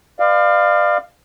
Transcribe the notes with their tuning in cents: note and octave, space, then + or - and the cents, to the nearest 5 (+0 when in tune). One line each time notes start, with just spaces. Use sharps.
B4 +45 D5 +40 F5 +0